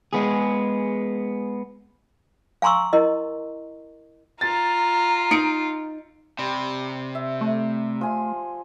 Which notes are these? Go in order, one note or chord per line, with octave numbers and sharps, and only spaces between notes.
G#3 B3 G#4
F5 G#5 A#5 C6 C#6 E6
E4 A#4 D#5
F4 A#5 A6
D#4 C#7 D7
C3 G3 C6
E5
A3
F3 G#5 C6